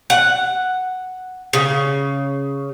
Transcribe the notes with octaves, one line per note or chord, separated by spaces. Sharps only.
F#5
C#3